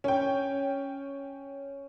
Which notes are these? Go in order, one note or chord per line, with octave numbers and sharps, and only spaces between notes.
C#4 G5